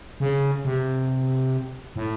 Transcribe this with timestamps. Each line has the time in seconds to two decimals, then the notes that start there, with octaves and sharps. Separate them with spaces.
0.20 C#3
0.65 C3
1.96 A2